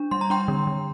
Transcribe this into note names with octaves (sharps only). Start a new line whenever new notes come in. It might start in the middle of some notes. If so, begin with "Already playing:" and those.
Already playing: D4
G3 C6
A#5
D4 G5 C6
D3
D3